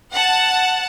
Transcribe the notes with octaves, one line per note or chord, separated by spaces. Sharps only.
F#5 A5